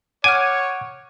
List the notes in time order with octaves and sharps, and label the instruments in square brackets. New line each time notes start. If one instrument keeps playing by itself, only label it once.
[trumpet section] C#5 [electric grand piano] F#5 D7 D#7 [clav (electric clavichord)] G#5 [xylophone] D6 F6